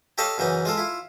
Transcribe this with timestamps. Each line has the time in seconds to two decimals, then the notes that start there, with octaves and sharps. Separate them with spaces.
0.18 G4 A4 C#5 D#5 F5 A5
0.38 F#2 C#3 E3 D#4
0.65 G#3 F4 A4
0.78 E4 F4